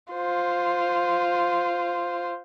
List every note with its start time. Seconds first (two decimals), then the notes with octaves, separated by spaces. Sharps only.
0.13 F4 C5